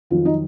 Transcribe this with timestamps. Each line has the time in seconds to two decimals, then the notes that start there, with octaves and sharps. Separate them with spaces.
0.10 F2 D#3 F#3 F4
0.25 D#4